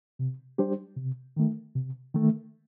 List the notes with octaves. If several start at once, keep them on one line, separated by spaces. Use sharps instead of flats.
C3
G3 D4 G4 C5
C3
D#3 A3
C3
D#3 A3